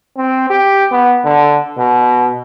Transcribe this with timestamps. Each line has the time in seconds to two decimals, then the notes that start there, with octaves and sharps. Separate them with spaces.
0.17 C4
0.50 G4
0.92 B3
1.25 D3
1.78 B2